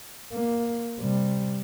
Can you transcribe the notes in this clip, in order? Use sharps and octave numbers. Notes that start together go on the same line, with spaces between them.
A#3
C3 G3